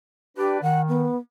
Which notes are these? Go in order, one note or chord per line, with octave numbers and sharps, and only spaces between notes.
D4 G4 B4 D5
D#3 F#5
B3